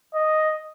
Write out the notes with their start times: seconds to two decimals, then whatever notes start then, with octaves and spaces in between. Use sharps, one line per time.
0.14 D#5